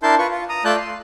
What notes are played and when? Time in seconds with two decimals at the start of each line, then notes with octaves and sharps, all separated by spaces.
0.03 D4 E4 A#4 A5 C6 G6
0.19 F4 B4 C#6
0.31 F4
0.49 A#5 D#6
0.65 A3 F4 D5 A5 F#6 G6
0.77 C6